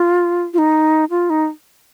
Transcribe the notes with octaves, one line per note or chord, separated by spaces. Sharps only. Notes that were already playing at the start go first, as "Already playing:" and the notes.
Already playing: F4
F4
D#4
F4
D#4